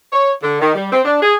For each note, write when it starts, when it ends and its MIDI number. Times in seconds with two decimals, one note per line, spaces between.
0.13 0.32 73
0.43 0.58 50
0.61 0.74 51
0.75 0.90 55
0.93 1.00 60
1.05 1.19 62
1.22 1.36 68